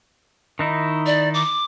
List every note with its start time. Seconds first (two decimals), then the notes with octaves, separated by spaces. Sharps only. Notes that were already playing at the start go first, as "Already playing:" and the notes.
0.59 D#3 D#4 E4
1.06 D5
1.34 D6